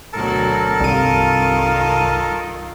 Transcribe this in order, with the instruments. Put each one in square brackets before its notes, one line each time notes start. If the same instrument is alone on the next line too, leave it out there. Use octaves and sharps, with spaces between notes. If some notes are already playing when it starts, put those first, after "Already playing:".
[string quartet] D2 B2 F#3 [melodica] A4 A#4 A5
[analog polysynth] C2 D#7 [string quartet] G2 D#3 F4